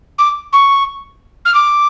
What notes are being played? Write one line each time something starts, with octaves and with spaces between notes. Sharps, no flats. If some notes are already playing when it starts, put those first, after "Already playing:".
D6
C#6
F6
D6